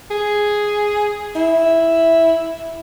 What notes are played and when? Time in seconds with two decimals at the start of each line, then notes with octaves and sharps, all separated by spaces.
0.11 G#4
1.36 E4